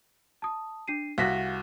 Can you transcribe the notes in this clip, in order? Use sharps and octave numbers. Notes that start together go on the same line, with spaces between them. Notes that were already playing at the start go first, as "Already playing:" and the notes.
A5 D#6
D4 C7 D#7
C2 F#4 F5 A#6 B6